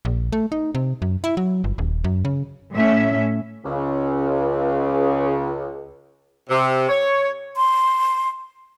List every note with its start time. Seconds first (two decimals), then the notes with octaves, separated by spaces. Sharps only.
0.05 A#1
0.32 A3
0.52 D#4
0.75 C3
1.02 F#2
1.24 E4
1.37 F#3
1.64 G1
1.78 D#1
2.04 F#2
2.25 C#3
2.74 A2 C#4 E5
3.65 C#2 C#3
6.50 C3
6.89 C#5
7.57 C6